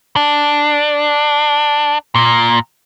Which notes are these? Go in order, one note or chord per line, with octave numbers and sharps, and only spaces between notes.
D4
A#2